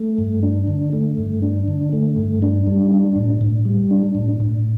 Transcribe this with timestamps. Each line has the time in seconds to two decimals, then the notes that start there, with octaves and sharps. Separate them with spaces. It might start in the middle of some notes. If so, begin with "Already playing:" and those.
Already playing: A3
0.19 G2
0.43 D4
0.68 D3
0.93 A3
1.17 G2
1.42 D4
1.68 D3
1.93 A3
2.16 G2
2.42 D4
2.67 G3
2.92 D4
3.16 A2
3.41 A2
3.65 G3
3.91 D4
4.15 A2
4.40 A2